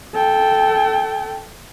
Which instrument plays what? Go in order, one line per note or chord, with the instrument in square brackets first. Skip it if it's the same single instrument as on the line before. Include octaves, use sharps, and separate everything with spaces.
[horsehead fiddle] A4 G5